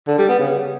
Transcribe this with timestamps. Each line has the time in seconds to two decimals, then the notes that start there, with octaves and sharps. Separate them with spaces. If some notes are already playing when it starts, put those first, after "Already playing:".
0.08 D3
0.18 G3
0.29 B3
0.39 C#3